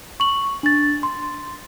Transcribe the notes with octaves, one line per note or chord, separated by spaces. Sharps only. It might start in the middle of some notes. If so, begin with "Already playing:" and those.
C#6 F#7
D4 A6
C6